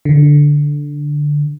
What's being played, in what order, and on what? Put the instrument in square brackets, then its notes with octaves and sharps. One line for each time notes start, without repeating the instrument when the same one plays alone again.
[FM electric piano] D3